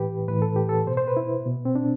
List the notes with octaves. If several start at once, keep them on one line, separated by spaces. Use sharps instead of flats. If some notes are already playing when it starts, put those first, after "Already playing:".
Already playing: A2 E3 G4 B4
A2 E3 B4
A4
G4
A4
B2 C5
C5
B4
E4
B2
C4
D4